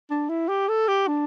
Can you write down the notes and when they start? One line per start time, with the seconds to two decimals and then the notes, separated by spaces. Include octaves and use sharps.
0.10 D4
0.29 E4
0.48 G4
0.68 A4
0.88 G4
1.07 D4